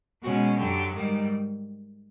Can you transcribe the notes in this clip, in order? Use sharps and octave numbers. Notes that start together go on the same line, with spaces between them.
B2 G#3 C#4 F#4
F#2 D3 F#3 G4
G#2 D#3 G3